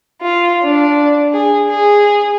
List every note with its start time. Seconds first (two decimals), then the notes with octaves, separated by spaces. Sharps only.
0.22 F4
0.63 D4
1.33 G#4
1.70 G#4